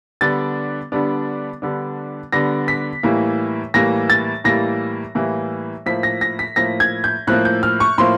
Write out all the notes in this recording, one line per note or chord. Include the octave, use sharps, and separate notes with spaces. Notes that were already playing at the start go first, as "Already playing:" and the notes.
D3 G3 B3 D4 A6
D3 G3 B3 D4
D3 G3 B3 D4
D3 G3 B3 D4 A#6
B6
A2 E3 G3 A#3
A2 E3 G3 A#3 A#6
A6
A2 E3 G3 A#3 A#6
A2 E3 G3 A#3
A2 F3 A#3 B6
A#6
A#6
B6
A2 F3 A#3 A#6
G#6
G6
A2 F3 A#3 F#6
G6
F6
C#6
A2 F3 A#3 C6